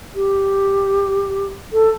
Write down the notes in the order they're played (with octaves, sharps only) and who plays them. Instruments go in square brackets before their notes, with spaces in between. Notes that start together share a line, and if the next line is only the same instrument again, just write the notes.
[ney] G4
A4